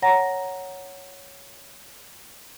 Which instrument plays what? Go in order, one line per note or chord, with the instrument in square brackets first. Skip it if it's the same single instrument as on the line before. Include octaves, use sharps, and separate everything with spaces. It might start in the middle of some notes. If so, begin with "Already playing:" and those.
[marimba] C#5 F#5 A#5 A#6